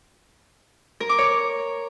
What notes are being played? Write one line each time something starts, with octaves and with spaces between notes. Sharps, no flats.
A#4
D6
C#5